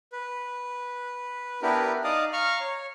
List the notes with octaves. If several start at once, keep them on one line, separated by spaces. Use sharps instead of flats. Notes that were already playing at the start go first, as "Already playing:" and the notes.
B4
B3 D4 E4 G4 A#4 B4
D#4 D5 D#5 F5 D6 D#6
F5 A#5 C#6 F6
C#5